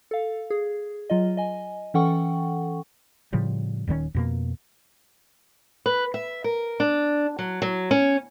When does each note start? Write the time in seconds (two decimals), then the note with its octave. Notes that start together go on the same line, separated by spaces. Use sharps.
0.11 A4 F5
0.50 G#4
1.10 F#3 F4 D#5
1.37 D#5 G#5
1.94 E3 C#4 A4 F#5 G5 C#6
3.33 A2 C#3 F3 G3
3.87 D#1 G2 D#3 C#4
4.15 F2 B2 A#3
5.86 B4
6.14 E5
6.44 A#4
6.80 D4
7.39 F#3
7.62 F#3
7.91 C#4